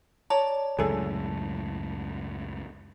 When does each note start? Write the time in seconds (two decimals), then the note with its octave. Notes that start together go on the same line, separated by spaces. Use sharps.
0.30 C#5 D5 A5 A#5
0.79 C#2 F#2 A2 G#4 A4